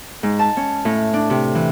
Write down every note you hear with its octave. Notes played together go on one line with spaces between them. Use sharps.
G#2
A5
C#4
A2
D4
C3
E3